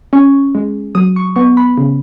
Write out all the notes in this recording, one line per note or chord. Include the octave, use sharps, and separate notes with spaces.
C#4 C#6
G#3
F#3 D#6
C#6
B3 C#6
B5
C#3